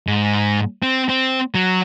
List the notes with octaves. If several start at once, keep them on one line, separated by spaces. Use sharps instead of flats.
G#2
C4
C4
F#3